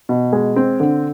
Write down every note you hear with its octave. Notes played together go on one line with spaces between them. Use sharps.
B2
G#3
C4
D3